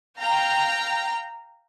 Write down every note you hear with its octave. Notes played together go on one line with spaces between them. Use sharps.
F5 G5 A#5